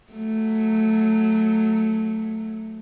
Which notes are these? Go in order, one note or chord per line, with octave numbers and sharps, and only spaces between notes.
F#3 A3